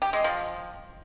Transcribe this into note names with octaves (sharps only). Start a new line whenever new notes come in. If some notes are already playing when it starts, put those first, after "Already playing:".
G4
G#3
F3